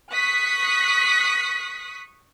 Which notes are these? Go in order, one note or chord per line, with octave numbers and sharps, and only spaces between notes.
C#6 D#6 F#6 B6